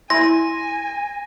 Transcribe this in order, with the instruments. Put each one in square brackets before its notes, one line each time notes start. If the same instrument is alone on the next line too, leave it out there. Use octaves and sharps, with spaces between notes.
[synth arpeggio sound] E4 [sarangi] G#5 [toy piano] C6 [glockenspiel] A#6